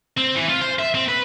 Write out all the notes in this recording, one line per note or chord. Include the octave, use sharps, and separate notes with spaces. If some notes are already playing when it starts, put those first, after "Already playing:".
C4
E3
F4
C5
E5
C4
B4